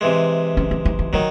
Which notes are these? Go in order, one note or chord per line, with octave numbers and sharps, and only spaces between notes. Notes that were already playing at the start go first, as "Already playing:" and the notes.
C3 E3 G#3
C#4
C#4
D#4
E4
D#3 F#3 D#4